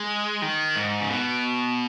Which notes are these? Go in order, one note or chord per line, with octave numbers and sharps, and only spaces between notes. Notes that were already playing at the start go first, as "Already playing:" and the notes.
Already playing: G#3
D#3
G#2
C#3
B2